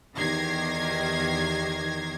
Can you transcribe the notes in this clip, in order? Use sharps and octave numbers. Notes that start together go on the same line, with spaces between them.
E2 D#3 G4 G#6 A#6 C7